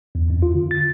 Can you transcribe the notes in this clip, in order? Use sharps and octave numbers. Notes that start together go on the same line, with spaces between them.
E2
F2
F4
D3
A6